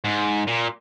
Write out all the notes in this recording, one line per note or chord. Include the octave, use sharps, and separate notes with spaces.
G#2
A#2